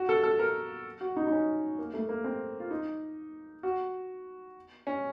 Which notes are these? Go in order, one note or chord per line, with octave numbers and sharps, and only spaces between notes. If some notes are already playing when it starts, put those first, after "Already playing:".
Already playing: F#4
A4
A4
A#4
F#4
D#4
D#4
C#4
A#3
A3
A#3
C4
F4
D#4
F#4
C#4